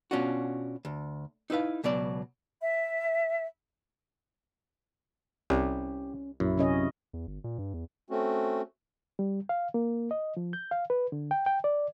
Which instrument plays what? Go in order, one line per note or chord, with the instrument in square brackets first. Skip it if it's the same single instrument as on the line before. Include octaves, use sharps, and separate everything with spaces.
[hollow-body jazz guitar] B2 C#4 D4 F4 F#4
D2
D#4 E4 B4 F5
C#2 B2 F#3 D5
[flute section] E5
[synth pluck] C2 [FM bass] C#4 [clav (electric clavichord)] G4
[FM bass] A#1 [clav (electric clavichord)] F#2 [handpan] E4
[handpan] C3 C#4 D#5
[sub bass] E2
G1
A#2
G2
E2
[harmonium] A3 C4 C#4 F#4
[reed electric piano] G3
F5
A#3
D#5
F3
G6
F5
B4
D3
G5
G5
D5